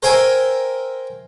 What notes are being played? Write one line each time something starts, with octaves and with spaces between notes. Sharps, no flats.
A#4 C5 E5 G5 G#5